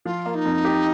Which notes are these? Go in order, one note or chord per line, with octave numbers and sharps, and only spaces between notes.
F3 F4
A#3
D#4
F2
G4